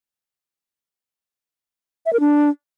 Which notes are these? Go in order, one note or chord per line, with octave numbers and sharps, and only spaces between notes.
E5
A#4
D4